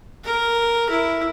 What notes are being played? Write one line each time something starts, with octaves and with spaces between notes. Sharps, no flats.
A#4
E4